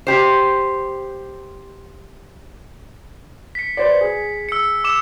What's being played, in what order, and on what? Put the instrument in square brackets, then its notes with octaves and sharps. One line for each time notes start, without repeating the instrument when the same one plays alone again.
[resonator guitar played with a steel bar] G4 C5
[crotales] B6 C#7
[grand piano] B4 C5 D5
G#4
[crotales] E6 C#7
D6 E6 E7